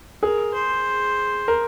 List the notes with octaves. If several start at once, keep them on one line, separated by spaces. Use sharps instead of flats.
G#4 A#4
C5
A#4